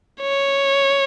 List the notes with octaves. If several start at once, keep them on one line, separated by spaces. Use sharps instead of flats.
C#5